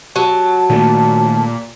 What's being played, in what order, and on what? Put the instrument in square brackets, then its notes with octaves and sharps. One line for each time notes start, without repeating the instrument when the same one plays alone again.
[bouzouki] F#3 [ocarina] A5
[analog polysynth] A#2 [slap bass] D#3 A3